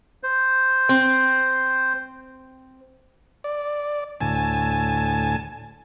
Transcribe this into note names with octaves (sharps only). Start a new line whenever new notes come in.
C5
C4
D5
D2 A2 G#5 A5